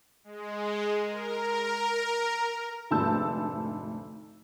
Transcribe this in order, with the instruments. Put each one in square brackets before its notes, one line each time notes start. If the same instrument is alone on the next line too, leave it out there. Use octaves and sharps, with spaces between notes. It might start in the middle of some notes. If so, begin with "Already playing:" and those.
[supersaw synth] G#3
A#4
[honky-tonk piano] F1 D2 G#2 A5 E6 G6